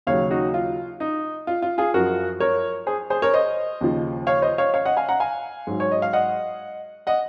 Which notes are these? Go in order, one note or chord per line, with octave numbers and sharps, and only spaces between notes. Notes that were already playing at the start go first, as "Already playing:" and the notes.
D#2 C#3 F#3 C#5 F5
D#4 F#4
F4
D#4
F4
F4
F4 G#4
F#2 F3 F#4 A#4
A#4 C#5
G#4 C5
G#4 C5
A#4 C#5
C5 D#5
D#2 C#3 F3
C#5 F5
C5 D#5
C#5 F5
C#5 F5
D#5 F#5
F5 G#5
F#5 A#5
F5 G#5
G#2 F#3
C#5
D#5
F5
D#5 F#5
D#5 F#5